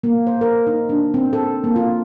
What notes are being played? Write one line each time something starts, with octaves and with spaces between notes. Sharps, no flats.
A#3
C5
A#4
D#4
D4
C4
A4
A#3
F4